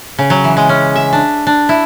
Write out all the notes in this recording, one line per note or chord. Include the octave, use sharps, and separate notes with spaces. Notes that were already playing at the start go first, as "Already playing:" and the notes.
C#3
F#3
E3
G#3
C#4
E5
D4
D4
E4